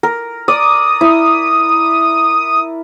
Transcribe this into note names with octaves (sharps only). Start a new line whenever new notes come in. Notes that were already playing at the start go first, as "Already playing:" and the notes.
A#4
D5 D#6
E4